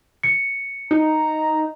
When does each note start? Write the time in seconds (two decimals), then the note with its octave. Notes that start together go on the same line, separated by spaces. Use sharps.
0.23 C#7
0.91 D#4 A#5